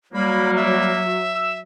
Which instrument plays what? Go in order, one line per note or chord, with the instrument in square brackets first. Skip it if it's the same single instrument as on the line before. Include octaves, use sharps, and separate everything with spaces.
[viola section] F#3 [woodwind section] G3 A#3 [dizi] B5
[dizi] E5
[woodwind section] E6